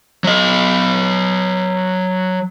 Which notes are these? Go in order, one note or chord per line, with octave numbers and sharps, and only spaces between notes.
F#3 D#5